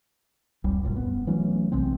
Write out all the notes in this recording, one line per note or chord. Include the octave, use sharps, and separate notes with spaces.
F1 C2 G3
D1 F#2 A#2 G3
B3
E3 F#3 A3 C#4
B1 C3 G#3 C4